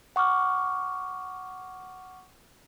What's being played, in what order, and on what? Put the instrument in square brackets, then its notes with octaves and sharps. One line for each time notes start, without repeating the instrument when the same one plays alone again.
[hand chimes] F#5 C#6 D6 F6